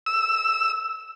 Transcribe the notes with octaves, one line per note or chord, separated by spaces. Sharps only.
E6